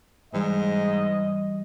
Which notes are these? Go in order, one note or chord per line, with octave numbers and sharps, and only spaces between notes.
G#2 E3 G3 D#5